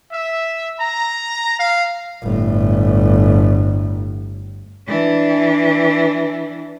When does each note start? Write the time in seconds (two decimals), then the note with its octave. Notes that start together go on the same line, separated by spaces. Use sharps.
0.12 E5
0.80 A#5
1.59 F5
2.23 G1 A2
4.88 E3 D4